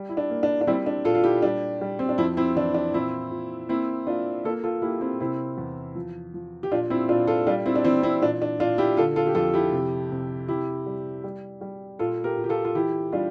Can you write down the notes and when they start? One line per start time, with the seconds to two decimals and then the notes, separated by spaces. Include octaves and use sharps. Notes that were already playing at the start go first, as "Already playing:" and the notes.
Already playing: G3
0.09 E4
0.17 D4
0.30 A#3
0.43 D4
0.61 D4
0.67 G3 C4 E4
0.86 D4
1.05 A#2 F4 A4
1.15 F4
1.24 E4 G4
1.42 G3 D4
1.81 G3
1.99 C4
2.09 D4
2.18 F2 C4 E4
2.37 C4 E4
2.56 E3 D4
2.74 D4
2.94 A#2 C4 E4
3.31 A#2
3.69 A#3 C4 E4
4.07 A#3 D4 F4
4.45 A#3 F4 A4
4.63 F4 A4
4.82 A#3 E4 G4
5.01 C4 E4
5.20 C3 C4 E4
5.58 E2
5.95 F3
6.34 F3
6.63 G4
6.71 A#2 D4 F4
6.90 C4 E4
7.09 A#2 D4 F4
7.27 F4 A4
7.47 G3 D4 F4
7.65 C4 E4
7.75 D4
7.84 E3 C4 E4
8.03 C4 E4
8.22 A#2 D4
8.42 D4
8.59 A#2 D4 F4
8.78 E4 G4
8.97 D3 F4 A4
9.16 F4 A4
9.27 G4
9.35 F2 F4 A4
9.54 E4 G4
9.72 C3
10.11 C3
10.48 C3 E4 G4
10.86 G3
11.24 G3
11.61 G3
11.99 A#2 F4 A4
12.24 G4 A#4
12.37 A#2
12.44 G4
12.49 F4 A4
12.65 F4
12.75 E3 E4 G4
13.12 G3 D4 F4